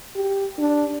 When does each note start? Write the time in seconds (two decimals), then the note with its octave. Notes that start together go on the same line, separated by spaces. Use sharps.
0.16 G4
0.59 D4